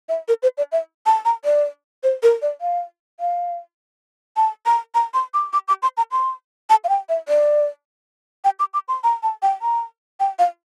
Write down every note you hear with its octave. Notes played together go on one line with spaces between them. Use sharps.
E5
A#4
C5
D5
E5
A5
A#5
D5
C5
A#4
D5
F5
F5
A5
A#5
A#5
C6
D6
D6
D6
C6
A#5
C6
A5
F5
G5
E5
D5
G5
D6
D6
C6
A#5
A5
G5
A#5
G5
F5